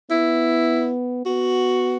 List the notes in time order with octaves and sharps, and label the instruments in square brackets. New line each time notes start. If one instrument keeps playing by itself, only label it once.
[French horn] B3 [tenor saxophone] E4
[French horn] B3 [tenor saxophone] F#4